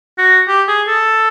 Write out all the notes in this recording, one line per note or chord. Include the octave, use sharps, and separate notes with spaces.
F#4
G4
G#4
A4